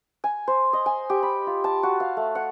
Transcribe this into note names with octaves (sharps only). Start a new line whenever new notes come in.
G#5
C5
D#5
G#5
G4
B5
F4
A5
F#4
F5
A3
F#5